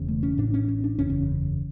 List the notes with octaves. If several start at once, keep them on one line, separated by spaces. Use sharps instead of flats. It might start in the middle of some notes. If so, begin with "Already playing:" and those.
Already playing: E1 E2 C#3
A3
C#4
A1 A2 D4
C#4
C#4
D4
F#1 E2 C#3 C#4
C#4